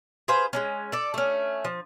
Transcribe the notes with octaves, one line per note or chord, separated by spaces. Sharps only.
G#4 B4 C5 F5
G#3 A#3 C#4
A4 D5
A3 C#4
F3